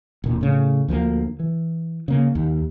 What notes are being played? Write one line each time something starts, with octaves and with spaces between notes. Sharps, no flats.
E1 A#2
A2 C#3
D2 F3 G#3 A#3
E3
C#3 A#3
D#2